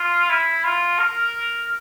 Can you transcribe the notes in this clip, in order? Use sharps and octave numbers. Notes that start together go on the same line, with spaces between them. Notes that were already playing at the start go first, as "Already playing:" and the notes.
Already playing: F4
E4
F4
A#4